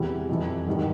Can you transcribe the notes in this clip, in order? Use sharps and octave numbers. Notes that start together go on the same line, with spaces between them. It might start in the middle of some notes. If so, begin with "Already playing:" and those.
Already playing: E2 C3 E3 G3
F2 C3 E3
G#1 G2 D#3 G3